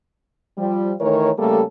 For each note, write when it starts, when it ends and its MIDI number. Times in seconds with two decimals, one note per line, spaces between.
0.58 0.93 53
0.58 0.93 55
1.01 1.30 51
1.01 1.30 52
1.01 1.30 57
1.01 1.30 70
1.01 1.30 73
1.38 1.63 49
1.38 1.63 55
1.38 1.63 57
1.38 1.63 58
1.38 1.63 67
1.38 1.63 69